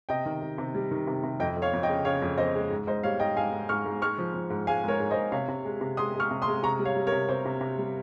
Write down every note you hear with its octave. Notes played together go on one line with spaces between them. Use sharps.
C3 D#5 G5
D#3
D#3
C3
G3
D#3
C3
C3
F2 D#5 G5
F2
C#5 F5
F2
D#5 G5
C#3
C#3 C#5 F5
F2
F2 C5 D#5
G#3
G#2
G#2 C5 D#5
G3 C#5 F5
G#2 D#5 G5
G#2 F5 G#5
G#2
G#2 C#6 F6
G#2
G#3 C#6 F6
F3
F3
G#2
G#3 F5 G#5
G#2 A#4 C#5
G#2
C5 D#5
G#2
C3 C#5 F5
C3
G#3
C3
G#3 C6 D#6
G#3
C#6 F6
C3
C6 D#6
G#3
C3 A#5 C#6
G3
C#5 F5
G3
A#4 C#5
C3
C3 C5
C3
C3
G3